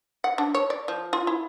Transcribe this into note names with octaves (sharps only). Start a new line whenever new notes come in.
F#5
D4
C#5
D5
F3
F4
E4